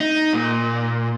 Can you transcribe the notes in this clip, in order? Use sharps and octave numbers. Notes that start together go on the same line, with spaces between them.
D#4
A#2